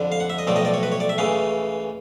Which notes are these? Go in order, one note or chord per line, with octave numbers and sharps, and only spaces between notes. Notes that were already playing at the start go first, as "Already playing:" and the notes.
Already playing: F2 D3 G3
F5
F#5
E5
D#5
B1 A2 F3 A3 D5
D#5
D5
C#5
B4
C#5
D5
E5
C#2 C#3 E3 A3 F5